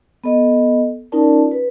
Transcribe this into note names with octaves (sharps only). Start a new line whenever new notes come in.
B3 A4 D#5
C#4 D#4 F4 A#4 D5 A5
B4